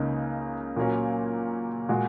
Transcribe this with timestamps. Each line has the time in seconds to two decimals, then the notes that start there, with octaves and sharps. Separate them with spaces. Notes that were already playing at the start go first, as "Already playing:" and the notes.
Already playing: C#2 C#3 A#3 D#4
0.76 A#2 F#3 A#3 C#4
1.89 A#2 G#3 F#4